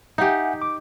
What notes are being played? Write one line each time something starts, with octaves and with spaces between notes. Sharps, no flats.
D#4 G4 E5 F#5 G#5
D6